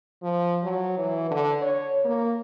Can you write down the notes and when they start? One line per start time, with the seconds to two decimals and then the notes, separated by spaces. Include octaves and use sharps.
0.22 F3
0.63 F#3
0.98 E3
1.31 D3
1.61 C#5
2.05 A#3